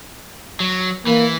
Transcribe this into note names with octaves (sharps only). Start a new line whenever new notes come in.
F#3
E3 A#3